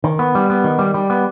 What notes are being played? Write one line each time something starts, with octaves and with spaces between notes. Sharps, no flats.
D#3
B3
G3
B3
D#3
G3
G3
B3